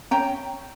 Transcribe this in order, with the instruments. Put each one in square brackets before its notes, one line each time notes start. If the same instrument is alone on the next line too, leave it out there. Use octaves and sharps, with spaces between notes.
[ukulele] C#4 G5 A#5